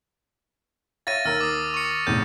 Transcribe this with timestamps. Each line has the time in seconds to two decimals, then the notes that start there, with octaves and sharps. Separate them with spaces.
1.07 C#5 E5 F5 A6 A#6 D#7
1.25 D#2 A#4 E6 F6 A6
1.41 D6 D#6
1.74 C#6 C#7
2.07 F1 E2 A2 G6